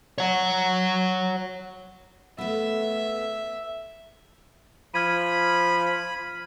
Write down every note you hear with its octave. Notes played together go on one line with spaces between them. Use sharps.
C#5 F#5
A3 B3 E5
F3 B5 F6 G#6 D#7